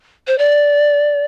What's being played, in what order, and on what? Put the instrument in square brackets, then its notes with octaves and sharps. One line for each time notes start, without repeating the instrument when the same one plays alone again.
[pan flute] C5
D5